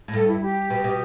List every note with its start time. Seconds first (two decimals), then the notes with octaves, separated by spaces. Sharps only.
0.08 A2
0.14 G2 A4
0.28 E4
0.42 G4
0.70 B2
0.84 B2